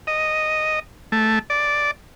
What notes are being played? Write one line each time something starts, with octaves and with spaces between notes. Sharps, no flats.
D#5
A3
D5